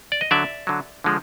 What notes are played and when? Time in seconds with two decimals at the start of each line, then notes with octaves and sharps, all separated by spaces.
0.12 D5
0.21 D#5
0.31 D3 F#3 D5 E5
0.67 D3 F#3
1.04 D3 F3 G#3